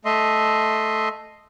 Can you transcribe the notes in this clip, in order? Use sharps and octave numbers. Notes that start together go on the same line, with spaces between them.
A3 D#5 E5 C6